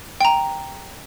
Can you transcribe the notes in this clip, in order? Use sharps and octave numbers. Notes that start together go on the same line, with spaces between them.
G5 A#5